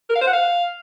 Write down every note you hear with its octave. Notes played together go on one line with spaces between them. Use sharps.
A#4
F5
C5
F#5
F5